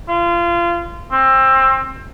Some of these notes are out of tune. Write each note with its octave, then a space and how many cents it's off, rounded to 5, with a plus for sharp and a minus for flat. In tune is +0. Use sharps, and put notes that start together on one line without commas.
F4 -25
C4 +25